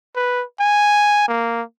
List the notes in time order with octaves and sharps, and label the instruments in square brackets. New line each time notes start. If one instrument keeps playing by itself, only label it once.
[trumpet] B4
G#5
A#3